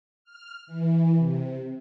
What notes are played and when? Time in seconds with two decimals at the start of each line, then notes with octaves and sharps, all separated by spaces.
0.24 F6
0.67 E3
1.17 C3